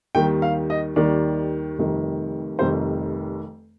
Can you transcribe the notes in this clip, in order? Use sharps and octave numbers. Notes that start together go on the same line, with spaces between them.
D#2 D#3 G3 G5
F5
D#5
D#2 D#3 G3 D5
F1 F2 D#3 G3
F1 F2 D#3 G3 C5